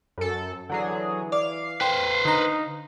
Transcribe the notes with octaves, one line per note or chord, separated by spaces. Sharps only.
F#2 A4
D3 E3 F#3 G#4
D5 F5 D6
B4 C5 G5
D3 D#4 A#5